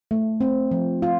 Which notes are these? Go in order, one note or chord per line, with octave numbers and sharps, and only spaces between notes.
A3
C4
F3
F4